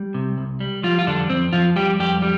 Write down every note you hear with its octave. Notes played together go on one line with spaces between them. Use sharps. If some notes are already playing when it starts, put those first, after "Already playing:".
Already playing: G3
C3
C2
G3
F3 G3 F4
F4
F2 D3 D4
F2 C4
F2 F3 F4
F2 G3 G4
F2 G3 G4
G3